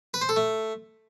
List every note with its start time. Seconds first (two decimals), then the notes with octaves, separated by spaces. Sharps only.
0.14 B4
0.21 C5
0.29 A4
0.36 A3